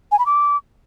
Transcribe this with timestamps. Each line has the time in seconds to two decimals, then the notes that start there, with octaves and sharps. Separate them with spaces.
0.12 G#5
0.19 B5
0.26 D6